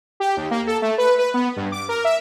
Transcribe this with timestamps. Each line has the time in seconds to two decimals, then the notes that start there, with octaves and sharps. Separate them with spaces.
0.20 G4
0.37 D#2
0.51 A#3
0.67 A4
0.82 A3
0.98 B4
1.19 B4
1.34 B3
1.56 G2
1.72 D6
1.89 A#4
2.04 E5